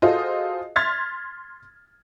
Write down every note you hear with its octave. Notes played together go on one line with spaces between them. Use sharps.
F4 F#4 G#4 A4 C5 D#5
C6 F6 G#6 A6 B6